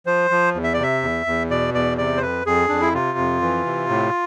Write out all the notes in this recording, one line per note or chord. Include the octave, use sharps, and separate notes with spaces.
F3 C5
F3
E2
E5
D5
C3 E5
E2
E2
B2 D5
E2 D5
C3 D5
C5
F2 B4
F2 G#4
F2 D4
E4
C3 F4
F2
E3
C3
A2